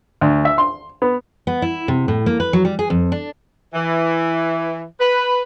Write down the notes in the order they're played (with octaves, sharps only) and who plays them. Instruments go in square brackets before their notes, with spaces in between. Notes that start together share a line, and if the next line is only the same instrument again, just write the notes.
[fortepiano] D2
E5
C6
B3
[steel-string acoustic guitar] B3
E4
C3
A2
A#3
B4
F#3
G3
G#4
F2
D4
[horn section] E3
B4